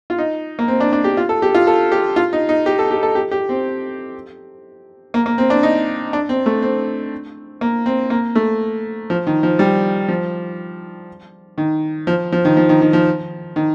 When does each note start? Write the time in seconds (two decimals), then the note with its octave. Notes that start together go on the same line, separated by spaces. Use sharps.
0.10 F4
0.18 D#4
0.59 A#3
0.68 C4
0.80 D4
0.93 D4
1.04 G4
1.17 F4
1.29 A4
1.42 G4
1.54 F4
1.67 A4
1.92 G4
2.16 F4
2.33 D#4
2.49 D#4
2.66 G4
2.79 A4
2.91 G4
3.03 A4
3.15 G4
3.31 G4
3.49 C4
5.14 A#3
5.26 A#3
5.38 C4
5.50 D4
5.63 D#4
6.13 D4
6.29 C4
6.46 A3
6.62 C4
7.61 A#3
7.86 C4
8.10 A#3
8.35 A3
9.10 F3
9.27 D#3
9.43 F3
9.59 G3
10.08 F3
11.58 D#3
12.07 F3
12.32 F3
12.45 D#3
12.57 F3
12.69 D#3
12.81 D#3
12.93 F3
13.56 D#3